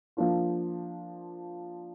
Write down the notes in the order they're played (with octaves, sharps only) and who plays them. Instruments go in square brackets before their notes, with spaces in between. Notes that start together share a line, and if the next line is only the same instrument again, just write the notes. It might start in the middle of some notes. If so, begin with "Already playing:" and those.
[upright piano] F3 A#3 D4 F4